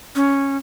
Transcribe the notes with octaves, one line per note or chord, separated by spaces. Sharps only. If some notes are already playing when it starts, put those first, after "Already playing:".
C#4